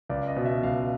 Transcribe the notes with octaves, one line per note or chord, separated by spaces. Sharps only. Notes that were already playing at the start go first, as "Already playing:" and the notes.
C#2 D5
D#5
B2
E5
C#2 F5